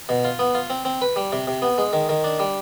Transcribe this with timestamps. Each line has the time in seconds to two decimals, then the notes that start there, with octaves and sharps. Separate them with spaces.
0.09 B2
0.25 F4
0.39 B3
0.55 F4
0.70 C4
0.85 C4
1.02 B4
1.16 G3
1.32 C3
1.48 C3
1.62 B3
1.78 G#3
1.93 D#3
2.09 D#3
2.24 D4
2.39 G3